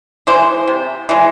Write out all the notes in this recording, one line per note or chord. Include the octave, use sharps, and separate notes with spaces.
E3 G#3 C5
C3
E3 G#3